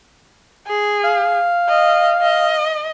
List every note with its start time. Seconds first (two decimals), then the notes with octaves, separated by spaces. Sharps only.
0.67 G#4
1.04 F5
1.69 D#5
2.22 D#5